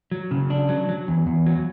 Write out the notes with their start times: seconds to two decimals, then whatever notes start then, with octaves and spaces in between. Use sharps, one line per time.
0.12 F#3
0.31 C#3
0.50 D4
0.69 F#3
0.89 F#3
1.08 E2
1.27 E2
1.46 F#3